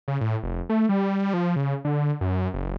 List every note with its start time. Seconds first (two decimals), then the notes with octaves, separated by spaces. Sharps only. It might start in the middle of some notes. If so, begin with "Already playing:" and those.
0.08 C#3
0.21 A2
0.43 F1
0.69 A3
0.89 G3
1.34 F3
1.56 C#3
1.85 D3
2.21 F#2
2.54 F#1